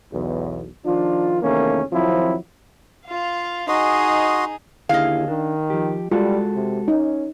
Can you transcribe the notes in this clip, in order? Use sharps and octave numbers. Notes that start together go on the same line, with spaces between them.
B1 E2
D#3 F3 D4 F4
E2 C3 D#3 A3 A#3 C#4
F2 D#3 F3 F#3 C4 E4
F4 F5
D#4 F#4 G#4 D#5 C6
D#2 D3 E4 G#4 D#5 F5
D#3 D4
F3 G4
G3 G#3 F4 F#4 A4
C3
C#4 D#4